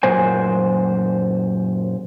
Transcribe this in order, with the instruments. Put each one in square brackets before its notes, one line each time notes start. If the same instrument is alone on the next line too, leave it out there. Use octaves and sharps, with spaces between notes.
[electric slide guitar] F#2 A#2 C5 G#5